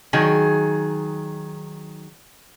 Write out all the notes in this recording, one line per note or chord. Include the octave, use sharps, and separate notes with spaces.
D#3 F#3 G#4